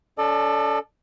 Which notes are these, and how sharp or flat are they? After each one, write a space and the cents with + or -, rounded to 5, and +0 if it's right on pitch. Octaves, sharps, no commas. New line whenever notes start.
C#4 +40 A4 +0 D5 +40